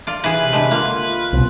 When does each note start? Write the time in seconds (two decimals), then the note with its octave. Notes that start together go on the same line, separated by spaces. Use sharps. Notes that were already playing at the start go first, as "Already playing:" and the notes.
0.07 F4 D5
0.24 E3 G#4 B4
0.39 C3
0.52 D3 G#3 A3
0.71 A#3 F4
1.33 C2 B2